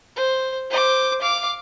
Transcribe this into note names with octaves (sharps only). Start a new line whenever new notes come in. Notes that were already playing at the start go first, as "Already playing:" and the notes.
C5
C5 D6
F5 D6